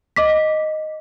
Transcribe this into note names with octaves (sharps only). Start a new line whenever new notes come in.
D#5 D6 B6